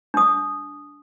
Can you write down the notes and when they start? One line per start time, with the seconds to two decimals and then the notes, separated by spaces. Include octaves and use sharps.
0.14 D4 D#6